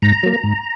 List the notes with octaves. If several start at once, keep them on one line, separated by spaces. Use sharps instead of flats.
G#2 A#5
F#3 A#3
G#2